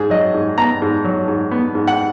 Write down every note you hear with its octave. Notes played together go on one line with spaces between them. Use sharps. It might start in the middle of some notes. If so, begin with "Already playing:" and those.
Already playing: G#2 G#4
F#3 D#5
G#2
B3 A#5
G#2
F#3
G#2
B3
G#2
F#5